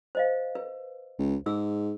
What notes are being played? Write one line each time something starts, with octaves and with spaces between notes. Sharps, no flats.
C5 D#5 F5
B4
C#2
G#2 G#4 E6